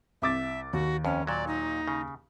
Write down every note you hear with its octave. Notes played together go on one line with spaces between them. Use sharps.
C2 E5 D6 A6
D#2 F#4
F2 C#4
A#2 F#3 D5
D#4
C#3